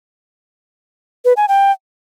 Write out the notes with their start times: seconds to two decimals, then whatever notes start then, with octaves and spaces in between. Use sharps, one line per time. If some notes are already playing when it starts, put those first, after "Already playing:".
1.25 B4
1.37 G#5
1.48 G5